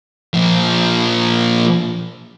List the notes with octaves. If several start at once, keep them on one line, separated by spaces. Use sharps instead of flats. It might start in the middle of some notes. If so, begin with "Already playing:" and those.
A#2 F3